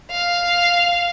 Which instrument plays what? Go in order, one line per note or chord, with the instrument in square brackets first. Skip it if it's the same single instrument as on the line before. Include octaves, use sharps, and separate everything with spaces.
[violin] F5